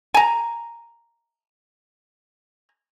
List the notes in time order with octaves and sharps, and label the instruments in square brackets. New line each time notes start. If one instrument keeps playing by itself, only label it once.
[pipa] G#5 A#5